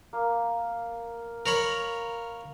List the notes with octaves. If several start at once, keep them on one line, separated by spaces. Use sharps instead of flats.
A#3
A#4 C#5 B5